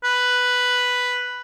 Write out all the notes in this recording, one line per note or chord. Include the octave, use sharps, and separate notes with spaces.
B4